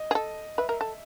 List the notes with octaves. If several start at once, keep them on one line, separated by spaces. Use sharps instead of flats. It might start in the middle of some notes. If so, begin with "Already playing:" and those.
Already playing: D#5
G#4
A4
B4 E5
A#4
A4